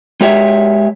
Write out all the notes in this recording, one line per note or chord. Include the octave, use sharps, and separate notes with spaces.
G#3 G4 C#5 E5